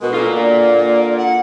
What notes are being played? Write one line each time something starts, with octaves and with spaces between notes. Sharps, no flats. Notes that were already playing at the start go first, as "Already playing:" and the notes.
D2 B2 G#3 A#4
F4 A4 A#4
D3 A#3 D5
F#5